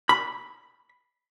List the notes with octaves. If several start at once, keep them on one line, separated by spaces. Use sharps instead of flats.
B5